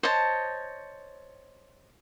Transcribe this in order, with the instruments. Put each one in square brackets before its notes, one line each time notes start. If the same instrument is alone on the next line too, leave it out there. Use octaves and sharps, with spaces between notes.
[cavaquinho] C5 C#5 D#5 A5